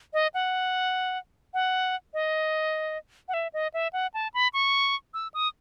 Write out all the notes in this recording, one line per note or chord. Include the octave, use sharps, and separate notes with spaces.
D#5
F#5
F#5
D#5
F#5
E5
D#5
E5
F#5
A5
B5
C#6
E6
D#6